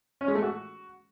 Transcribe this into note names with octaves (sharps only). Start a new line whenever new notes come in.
C#4
G#3
A3
F#4